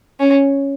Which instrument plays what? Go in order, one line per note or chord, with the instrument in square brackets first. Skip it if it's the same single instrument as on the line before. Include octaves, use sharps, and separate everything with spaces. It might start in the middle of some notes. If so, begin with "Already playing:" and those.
[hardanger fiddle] C#4